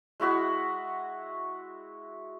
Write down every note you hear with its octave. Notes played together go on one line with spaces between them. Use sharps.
G#3 E4 F#4 E5